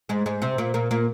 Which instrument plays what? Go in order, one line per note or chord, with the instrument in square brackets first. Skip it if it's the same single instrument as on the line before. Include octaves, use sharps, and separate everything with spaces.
[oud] G#2 G#3
G#2 G#3
C3 C4
A#2 A#3
A#2 A#3
A#2 A#3